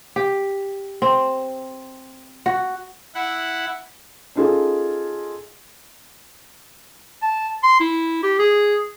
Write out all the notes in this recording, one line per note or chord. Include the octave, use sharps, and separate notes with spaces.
G4
C4
F#4
E4 F#5
C#4 D#4 F4 G#4 A4
A5
C6
E4
G4
G#4